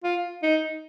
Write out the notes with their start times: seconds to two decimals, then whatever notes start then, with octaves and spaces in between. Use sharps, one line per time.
0.04 F4
0.43 D#4